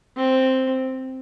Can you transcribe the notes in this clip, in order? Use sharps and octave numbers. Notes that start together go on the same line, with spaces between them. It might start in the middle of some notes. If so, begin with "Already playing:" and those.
C4